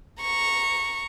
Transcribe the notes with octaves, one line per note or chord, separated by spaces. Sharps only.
A#5 C#6